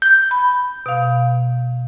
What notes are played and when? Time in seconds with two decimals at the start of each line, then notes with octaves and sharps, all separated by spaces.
0.02 G6
0.31 B5
0.86 B2 F5